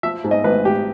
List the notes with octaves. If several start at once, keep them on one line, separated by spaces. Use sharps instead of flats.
F3 E5
G#2
D#5
G#1 B4
G#1 G4